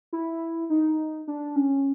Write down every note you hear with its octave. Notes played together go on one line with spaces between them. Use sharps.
E4
D#4
D4
C#4